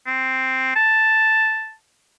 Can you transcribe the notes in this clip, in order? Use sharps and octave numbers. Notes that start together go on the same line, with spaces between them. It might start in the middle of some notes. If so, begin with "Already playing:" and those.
C4
A5